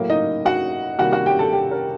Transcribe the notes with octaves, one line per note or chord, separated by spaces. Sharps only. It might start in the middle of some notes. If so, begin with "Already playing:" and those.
Already playing: A2 F#3 A#3
D#4 D#5
F#4 F#5
C3 D#3 G3 A#3 F#4 F#5
F#4 F#5
G4 G5
A4 A5
G4 G5
A#4